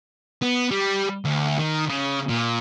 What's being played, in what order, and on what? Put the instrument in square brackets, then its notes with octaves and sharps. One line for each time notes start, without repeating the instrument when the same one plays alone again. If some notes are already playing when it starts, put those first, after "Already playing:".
[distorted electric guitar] B3
G3
D2
D#3
C#3
A#2